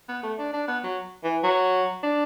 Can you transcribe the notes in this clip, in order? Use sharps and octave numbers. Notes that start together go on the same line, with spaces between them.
B3
A3
D4
D4
B3
F#3
E3
F#3
D4